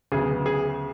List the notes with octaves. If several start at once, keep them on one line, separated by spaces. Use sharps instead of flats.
D2 C#3 F#3 B3 G#4
G#4